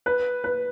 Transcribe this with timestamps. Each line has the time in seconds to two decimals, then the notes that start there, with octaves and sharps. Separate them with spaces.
0.06 B4
0.44 B4